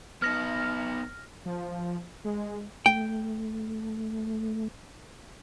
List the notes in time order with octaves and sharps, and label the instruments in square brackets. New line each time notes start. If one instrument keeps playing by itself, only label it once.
[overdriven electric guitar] B3 D#4 [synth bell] F6 A#6
[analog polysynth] F3
G#3
[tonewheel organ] A3 [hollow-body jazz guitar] G5